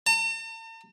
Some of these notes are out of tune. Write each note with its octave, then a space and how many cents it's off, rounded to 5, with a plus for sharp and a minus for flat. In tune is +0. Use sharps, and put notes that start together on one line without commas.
A5 +45